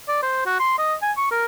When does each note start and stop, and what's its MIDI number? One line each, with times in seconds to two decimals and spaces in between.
0.08 0.22 74
0.22 0.42 72
0.46 0.59 66
0.60 0.74 84
0.78 0.94 75
1.02 1.12 80
1.17 1.30 85
1.31 1.46 70